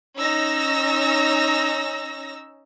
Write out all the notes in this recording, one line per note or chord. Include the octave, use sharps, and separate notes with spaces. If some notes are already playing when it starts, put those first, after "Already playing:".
C#4 D#4 E6 A#6